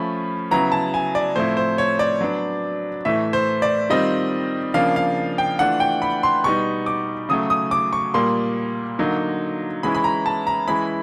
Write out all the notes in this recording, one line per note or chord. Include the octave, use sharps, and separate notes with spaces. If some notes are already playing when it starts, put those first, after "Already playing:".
Already playing: F3 A3 C#4 B5
C#3 F#3 B3 E4 A#5
A5
G#5
D5
A2 F3 A3 C4 E4 C5
C5
C#5
D5
F#3 B3 D4
A2 E3 A3 E5
C5
D5
D#3 G3 C4 F4 D#5
C#3 F3 A#3 D4 F5
F5
G5
E3 A3 D4 F4 F#5
G5
B5
C6
B2 G3 B3 D#4 C#6
D6
C#3 F#3 A3 D#6
D#6
D6
C#6
A#2 G3 A#3 C6
D3 F#3 A#3 D#4
E3 G#3 C#4 E4 B5
B5
A#5
A5
A#5
E3 G#3 C#4 E4 B5